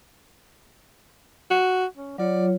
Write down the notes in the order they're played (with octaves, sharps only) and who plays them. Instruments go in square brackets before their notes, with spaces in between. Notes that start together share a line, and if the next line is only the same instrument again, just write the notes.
[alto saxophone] F#4
C#4
[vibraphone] F#3 F4 C#5 [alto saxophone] D5